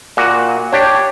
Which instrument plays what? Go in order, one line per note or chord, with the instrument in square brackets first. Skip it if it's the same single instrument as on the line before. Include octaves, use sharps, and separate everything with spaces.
[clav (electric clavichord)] A#2 F#4
[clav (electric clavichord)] D4 G4 [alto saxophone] C#5